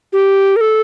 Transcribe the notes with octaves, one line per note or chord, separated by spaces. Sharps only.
G4
A#4
A4